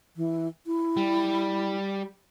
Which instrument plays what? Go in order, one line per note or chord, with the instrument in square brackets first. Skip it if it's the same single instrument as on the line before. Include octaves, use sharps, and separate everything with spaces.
[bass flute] E3
E4
[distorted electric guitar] G3